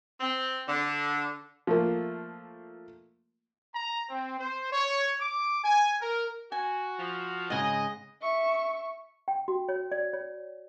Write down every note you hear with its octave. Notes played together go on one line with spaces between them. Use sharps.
C4
D3
F3 A3 A#3
A#5
C4
C5
C#5
D6
G#5
A#4
F#4 G#5
F3
G#2 C#3 D#5 F#5 G#5
E5 C#6
G5
F#4
C#5
D5
C#5